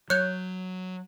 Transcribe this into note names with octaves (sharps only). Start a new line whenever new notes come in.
F#3 C#5 F#6 G6